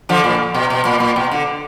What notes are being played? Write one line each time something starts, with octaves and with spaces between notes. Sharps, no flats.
D3 F3
A#2
B2
B2
A#2
A#2
B2
D3